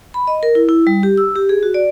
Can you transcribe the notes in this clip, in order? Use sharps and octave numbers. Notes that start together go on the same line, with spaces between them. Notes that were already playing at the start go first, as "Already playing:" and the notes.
B5
D#5
A#4
E4
E4
G3
G4
E6
G4
G#4
F#4
D5